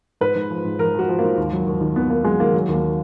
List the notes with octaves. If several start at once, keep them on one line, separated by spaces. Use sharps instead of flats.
G#2 B4
G#2
F3
G#2
F3 A#4
F3 F#4
F3
A#3
G#2
D#2
F#3
D#2
D#3
D#2 B3
D#3 A#3
F#3 G#3
D#3 A#3
F#3
D#2 A#3